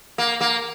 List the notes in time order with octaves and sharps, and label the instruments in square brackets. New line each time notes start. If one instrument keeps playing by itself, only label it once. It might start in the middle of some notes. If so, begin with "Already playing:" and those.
[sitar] A#3
A#3